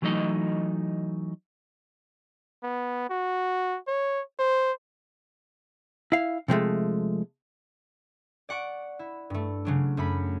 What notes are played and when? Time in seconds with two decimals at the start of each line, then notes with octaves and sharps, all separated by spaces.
0.02 E3 F#3 A3 D#4 D#5
2.63 B3
3.10 F#4
3.88 C#5
4.39 C5
6.12 E4 F5
6.48 C3 F3 G#3 A3
8.49 D5 F#5 C#6 D7
8.99 E4
9.30 G2 A3
9.65 C#3 F#3 D4
9.97 F#2 A3 B5 B6